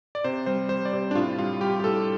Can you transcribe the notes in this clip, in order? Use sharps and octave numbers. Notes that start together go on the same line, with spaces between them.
D5
C3 C5
G3 C5
G3 C5
D5
C3 C5
D4
A2 F4
G3 F4
G3 G4
G4
A2 A4